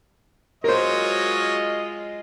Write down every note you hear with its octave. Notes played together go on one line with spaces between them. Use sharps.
F#3 G#3 F4 A#4 C5 C#5 D#5